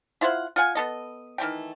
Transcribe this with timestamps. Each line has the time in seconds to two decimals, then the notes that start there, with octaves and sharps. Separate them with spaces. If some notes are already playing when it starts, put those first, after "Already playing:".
0.21 E4 F4 C5 F#5
0.56 F4 F#5 G#5
0.75 B3 A4 D#5
1.38 D#3 E3 A3 G5